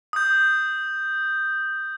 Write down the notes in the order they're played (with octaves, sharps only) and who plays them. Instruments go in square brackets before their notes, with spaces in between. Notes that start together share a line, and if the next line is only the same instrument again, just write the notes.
[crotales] D#6 G6